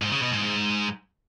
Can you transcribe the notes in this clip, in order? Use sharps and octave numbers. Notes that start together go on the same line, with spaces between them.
G#2
C#3
B2
G#2
G#2